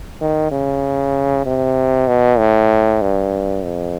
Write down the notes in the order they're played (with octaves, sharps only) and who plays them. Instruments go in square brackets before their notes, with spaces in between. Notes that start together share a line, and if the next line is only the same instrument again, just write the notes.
[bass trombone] D#3
C#3
C3
B2
A2
G2
F2